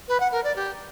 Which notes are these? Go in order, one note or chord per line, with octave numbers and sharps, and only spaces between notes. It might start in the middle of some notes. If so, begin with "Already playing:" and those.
B4
F#5
A#4
D5
G4